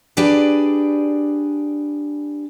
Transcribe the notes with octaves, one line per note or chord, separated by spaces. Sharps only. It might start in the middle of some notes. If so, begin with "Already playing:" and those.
D4 G4 G#4 B4 D5